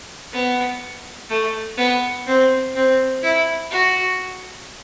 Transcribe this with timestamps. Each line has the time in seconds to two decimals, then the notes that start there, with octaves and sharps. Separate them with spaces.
0.32 B3
1.30 A3
1.77 B3
2.27 C4
2.75 C4
3.23 E4
3.71 F#4